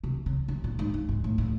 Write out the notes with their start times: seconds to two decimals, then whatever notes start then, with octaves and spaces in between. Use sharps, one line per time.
0.04 C3
0.26 C#3
0.48 D3
0.64 A#2
0.79 G#2
0.94 G2
1.09 G#2
1.24 A2
1.38 A2